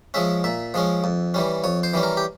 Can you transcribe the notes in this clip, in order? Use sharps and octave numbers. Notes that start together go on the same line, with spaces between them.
F3 G#3 C#4 E5
A#2 E5
F3 G#3 C#4
F2
E3 G3 C#4
F2 C#5
C5
E3 G3 C#4
A#4
G4